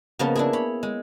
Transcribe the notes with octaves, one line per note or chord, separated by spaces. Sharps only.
C#3 F3 A#3 B3 D#5 A5
D4 E4 G#4
C#5 B5
G#3